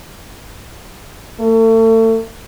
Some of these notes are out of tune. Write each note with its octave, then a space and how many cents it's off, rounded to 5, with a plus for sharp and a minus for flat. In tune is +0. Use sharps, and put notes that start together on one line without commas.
A3 +35